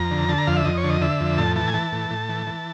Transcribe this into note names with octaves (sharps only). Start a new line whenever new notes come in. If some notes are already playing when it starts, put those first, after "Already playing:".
Already playing: F2 A#5
D3
D3 A5
A#5
F2 F5
E5
F2 D#5
C#5
D3
D#5
D3 E5
F2
A2 A5
E3 A5
G#5
E3 A5
A2
A2
E3
E3